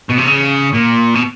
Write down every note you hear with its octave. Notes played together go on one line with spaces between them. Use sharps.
B2
C3
C#3
A#2
B2